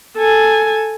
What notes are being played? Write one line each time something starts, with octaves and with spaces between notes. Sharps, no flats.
A4 G#5